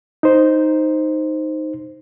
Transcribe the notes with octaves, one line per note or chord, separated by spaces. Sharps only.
D#4 C5